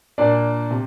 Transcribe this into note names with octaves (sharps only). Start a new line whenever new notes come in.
A#2 A#3 D4 D5
C3